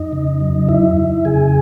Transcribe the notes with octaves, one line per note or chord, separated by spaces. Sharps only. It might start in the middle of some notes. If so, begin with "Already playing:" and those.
Already playing: F2 D#4 D#5
C#3
F#3
F2 E4 E5
F2
C#3 G#4 G#5